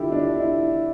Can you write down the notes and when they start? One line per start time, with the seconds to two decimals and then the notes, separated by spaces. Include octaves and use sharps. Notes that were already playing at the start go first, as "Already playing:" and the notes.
Already playing: G1 G2 D3 E4 F4 G4 A4
0.12 D4
0.40 E4